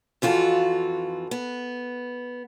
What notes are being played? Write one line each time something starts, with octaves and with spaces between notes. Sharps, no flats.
F2 E3 F4 F#4 A4
B3